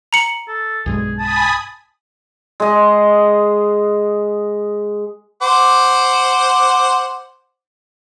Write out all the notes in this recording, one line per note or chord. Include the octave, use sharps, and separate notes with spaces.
A#5 C#7 F#7
A4
B1 G2 G#3 G#4
G#5 A5 B5 D#6
G#3 D#5
C5 F#5 D6